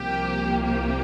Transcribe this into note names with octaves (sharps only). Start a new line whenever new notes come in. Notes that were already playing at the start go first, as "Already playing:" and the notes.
Already playing: C2 C3 F3 A#3 G4
G4